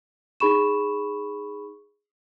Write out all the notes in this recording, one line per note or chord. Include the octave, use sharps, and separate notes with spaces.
D#4 G#4 B5 C#6 E7